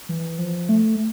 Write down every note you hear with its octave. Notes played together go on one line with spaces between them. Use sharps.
E3
F3
A3